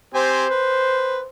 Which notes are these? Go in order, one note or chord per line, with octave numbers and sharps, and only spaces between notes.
C4 G4 C5 G#5
B4